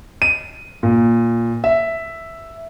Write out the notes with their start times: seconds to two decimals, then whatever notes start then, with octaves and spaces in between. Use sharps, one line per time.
0.22 D#7
0.83 A#2
1.64 E5